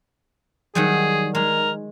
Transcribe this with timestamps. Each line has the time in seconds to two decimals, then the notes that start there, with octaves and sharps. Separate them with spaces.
0.75 D#3 F#3 G3 G#4
1.35 G#3 A#4